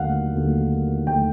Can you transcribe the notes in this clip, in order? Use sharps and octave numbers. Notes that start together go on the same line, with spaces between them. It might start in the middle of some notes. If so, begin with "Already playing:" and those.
Already playing: D#2 D3 F#3 A3 F5 F#5
D#2 D3 F#3 A3
D#2 D3 F#3 A3 G5